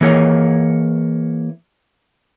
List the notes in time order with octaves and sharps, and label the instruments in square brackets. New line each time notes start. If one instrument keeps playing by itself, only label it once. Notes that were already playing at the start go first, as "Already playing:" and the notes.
[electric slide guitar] E3 A#3 G#4 C#5